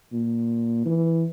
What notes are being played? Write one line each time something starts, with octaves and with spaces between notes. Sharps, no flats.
A#2
E3